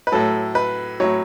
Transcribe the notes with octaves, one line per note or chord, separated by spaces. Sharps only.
B4
A2 F#3 A4
B4
A2 F#3 C#5